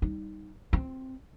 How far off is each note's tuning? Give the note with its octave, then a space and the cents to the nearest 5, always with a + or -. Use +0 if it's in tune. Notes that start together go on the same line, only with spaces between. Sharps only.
G3 +0 D#4 +0
C4 +0 F4 +30